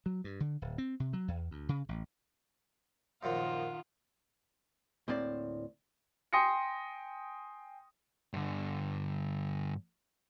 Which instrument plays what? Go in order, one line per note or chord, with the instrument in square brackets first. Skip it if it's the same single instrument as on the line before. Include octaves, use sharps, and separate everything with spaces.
[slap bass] F#3
G2
D3
D1
C4
C3
F#3
E2
D2
C#3
A1
[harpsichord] F#2 A#2 F3 [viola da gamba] D#3 F4 [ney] F#5
[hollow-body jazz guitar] D2 A2 A#3 C4 C5 D5
[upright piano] G5 G#5 C6 D#6 A#6 C#7
[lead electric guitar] G2 D3